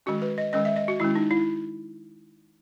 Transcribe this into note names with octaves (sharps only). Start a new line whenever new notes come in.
D#3 G#3 C#4 F#4
B4
D#5
D#3 G#3 C#4 D#5
E5
D#5
F#4
D#3 G#3 C#4 E4
D#4
E4